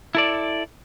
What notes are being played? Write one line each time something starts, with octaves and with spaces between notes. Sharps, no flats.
E4 A4 D5